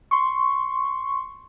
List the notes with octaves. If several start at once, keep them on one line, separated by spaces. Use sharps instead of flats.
C6 C#6